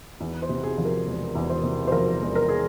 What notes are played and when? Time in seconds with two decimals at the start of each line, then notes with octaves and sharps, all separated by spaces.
0.20 E2
0.42 C5
0.49 C3
0.63 G#4
0.78 F3
0.85 A#4
1.06 E1
1.35 E2
1.49 C5
1.63 C3
1.87 C5
1.92 F3 A#4
2.21 E1
2.35 A#4
2.49 G#4